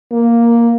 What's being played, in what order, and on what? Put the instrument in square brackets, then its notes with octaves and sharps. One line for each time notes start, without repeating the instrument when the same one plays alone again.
[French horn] A#3